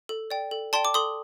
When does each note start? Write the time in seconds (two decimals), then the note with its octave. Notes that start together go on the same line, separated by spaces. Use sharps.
0.09 A4
0.31 D5 G5
0.51 A4
0.73 D5 G5 A5 C6
0.85 D6
0.94 A4 C6 D#6